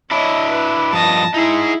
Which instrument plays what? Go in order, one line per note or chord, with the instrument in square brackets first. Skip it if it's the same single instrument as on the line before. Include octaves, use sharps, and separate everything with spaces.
[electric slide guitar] D4 E4 [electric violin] C#5 D#5
[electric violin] B4
[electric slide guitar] G2 F3 D#5 [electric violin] A5 A#6
[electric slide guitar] D#4 G#4 [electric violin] E4